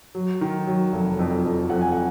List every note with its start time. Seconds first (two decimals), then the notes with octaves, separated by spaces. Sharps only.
0.15 F#3
0.41 D#3
0.67 F#3
0.93 F1
1.19 F2
1.45 F2
1.70 F2 F#5
1.81 G#5
1.92 F#5